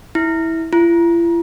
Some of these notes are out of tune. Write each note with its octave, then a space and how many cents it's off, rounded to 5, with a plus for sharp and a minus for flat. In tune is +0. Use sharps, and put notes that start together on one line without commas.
E4 -15
E4 +45